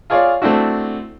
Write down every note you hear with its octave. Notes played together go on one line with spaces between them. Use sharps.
F4 G#4 C#5 D5 F5
A3 C4 D4 E4 F#4